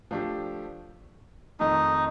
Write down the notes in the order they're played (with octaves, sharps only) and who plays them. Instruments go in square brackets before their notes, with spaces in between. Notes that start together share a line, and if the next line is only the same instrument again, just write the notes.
[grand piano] F3 A3 D4 G4
[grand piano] F2 D#3 A3 [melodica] D#4